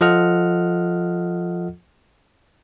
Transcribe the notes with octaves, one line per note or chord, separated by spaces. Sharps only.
F3 F4 A4 D#5 F#5 F6